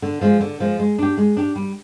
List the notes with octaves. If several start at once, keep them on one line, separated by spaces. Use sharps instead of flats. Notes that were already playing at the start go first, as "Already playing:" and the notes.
D3
F3 G#3
D3
F3 G#3
G#3
D4 G4
G#3
D4 G4
G3